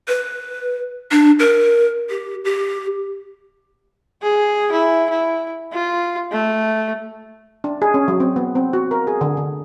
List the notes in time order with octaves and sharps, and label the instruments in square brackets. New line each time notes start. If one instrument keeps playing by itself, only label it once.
[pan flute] B4
D4
A#4
G4
G4
[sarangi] G#4
E4
E4
F4
A3
[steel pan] D4
G#4
C#4
F#3
C4
B3
C4
F#4
A#4
G#4
D3
D3